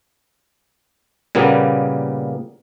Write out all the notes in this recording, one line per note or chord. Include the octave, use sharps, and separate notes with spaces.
A#2 C#3 G3 A#3 B3